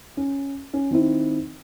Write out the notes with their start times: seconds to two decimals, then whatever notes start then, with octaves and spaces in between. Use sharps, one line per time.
0.17 C#4
0.73 C#4
0.91 D#3 C4 D#4 E4